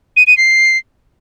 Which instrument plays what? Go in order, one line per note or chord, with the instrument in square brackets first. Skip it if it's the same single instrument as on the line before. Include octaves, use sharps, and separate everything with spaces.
[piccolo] D#7
D#7
C7